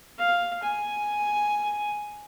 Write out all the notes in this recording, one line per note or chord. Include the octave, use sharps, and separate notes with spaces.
F5
G#5